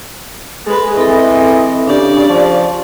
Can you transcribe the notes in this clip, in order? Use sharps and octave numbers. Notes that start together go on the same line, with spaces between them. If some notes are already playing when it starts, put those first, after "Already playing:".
G#3 G#4 A4 B4
E3 C4 A4 D#5
C#3 D4 G4 D5
F3 C#6